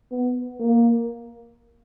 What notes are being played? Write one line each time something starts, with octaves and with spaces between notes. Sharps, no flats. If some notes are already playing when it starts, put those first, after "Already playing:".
B3
A#3